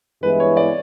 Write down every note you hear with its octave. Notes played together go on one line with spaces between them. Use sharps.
G2 E3 G#3 B3 E4 B4
C#5
D5